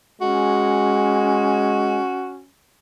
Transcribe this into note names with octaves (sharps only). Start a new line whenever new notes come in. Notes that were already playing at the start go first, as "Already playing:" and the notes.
G#3 C#4 F#4